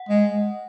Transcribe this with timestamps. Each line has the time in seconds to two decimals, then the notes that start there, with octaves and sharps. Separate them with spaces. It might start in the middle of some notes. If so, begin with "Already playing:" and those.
Already playing: F#5
0.09 G#3